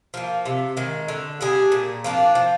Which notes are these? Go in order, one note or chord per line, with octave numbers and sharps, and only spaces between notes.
F3 A#3
C3
D#3 G#3
D3
G3 D4 G#4
A#2
F3 A#3 D4
F3